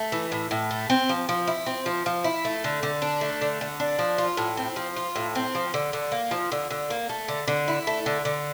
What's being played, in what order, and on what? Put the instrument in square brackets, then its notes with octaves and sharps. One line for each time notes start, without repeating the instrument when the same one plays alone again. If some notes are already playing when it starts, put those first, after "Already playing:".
Already playing: [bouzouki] A3
E3
A2
A2
A3
C4
F3
F3
E4
C4
F3
F3
E4
A3
D3
D3
D4
A3
D3
D3
D4
F3
F4
A2
C4
F3
F4
A2
C4
F3
D3
D3
A#3
F3
D3
D3
A#3
A3
D3
D3
E4
A3
D3
D3